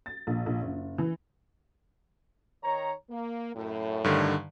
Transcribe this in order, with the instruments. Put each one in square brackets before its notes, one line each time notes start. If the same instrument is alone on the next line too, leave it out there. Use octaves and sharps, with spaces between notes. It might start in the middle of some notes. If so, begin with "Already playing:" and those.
[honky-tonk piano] A6
A#1
A#1
F#1
E3
[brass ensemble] D#3 C#5 A#5
A#3
F#2 A2
[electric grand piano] G2 D3 D#3